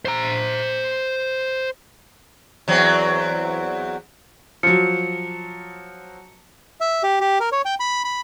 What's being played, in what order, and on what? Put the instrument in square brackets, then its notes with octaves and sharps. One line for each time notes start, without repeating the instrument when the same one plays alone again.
[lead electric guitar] C5 A#5
[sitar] E2 F#3 C4
[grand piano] F3 F#3 [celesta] C#7
[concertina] E5
G4
G4
A#4
C#5
G5
B5
B5